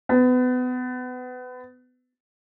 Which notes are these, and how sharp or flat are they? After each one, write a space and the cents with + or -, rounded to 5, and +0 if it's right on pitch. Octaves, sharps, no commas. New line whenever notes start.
B3 +30